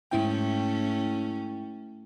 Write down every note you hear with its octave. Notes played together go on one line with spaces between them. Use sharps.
G#2 A3 C#4 E4 G5